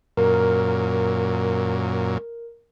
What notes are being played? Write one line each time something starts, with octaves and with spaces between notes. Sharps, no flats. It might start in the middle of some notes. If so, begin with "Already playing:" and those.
F#2 A#2 A#4